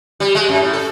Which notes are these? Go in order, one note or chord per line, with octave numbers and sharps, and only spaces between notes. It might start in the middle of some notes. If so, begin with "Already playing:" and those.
G3
G#3
F#2
A2
A4